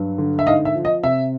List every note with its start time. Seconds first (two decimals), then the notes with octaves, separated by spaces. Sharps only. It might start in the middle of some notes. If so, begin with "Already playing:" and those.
Already playing: G2 F#3
0.18 D3
0.39 E5
0.46 G#2 D#5 F5
0.65 E5
0.75 F3
0.85 D#5
1.04 C3 E5